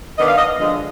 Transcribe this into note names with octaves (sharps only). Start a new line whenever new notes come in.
D#3 B3 D4 D#5
F5
D#5
D3 F3 G#3 D4 D#5